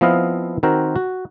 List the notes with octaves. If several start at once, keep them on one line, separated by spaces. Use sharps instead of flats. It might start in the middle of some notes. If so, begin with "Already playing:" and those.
F3 B3 C4 E4 D#5 F5
D#3 C4 F#4 A#4 C5
F#4